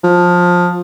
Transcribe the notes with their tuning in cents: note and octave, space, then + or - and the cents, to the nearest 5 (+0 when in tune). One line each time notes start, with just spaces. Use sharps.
F3 +20